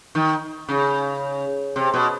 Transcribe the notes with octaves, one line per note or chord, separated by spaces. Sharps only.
D#3
C#3
C3
B2